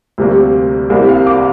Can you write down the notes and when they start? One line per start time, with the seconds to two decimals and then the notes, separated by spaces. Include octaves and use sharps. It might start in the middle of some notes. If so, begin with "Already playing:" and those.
0.18 D2 C3 G3 A#3
0.90 C2 C3 G3 A#3 A#4
1.09 F5
1.27 D6